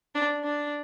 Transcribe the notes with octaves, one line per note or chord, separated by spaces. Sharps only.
D4
D4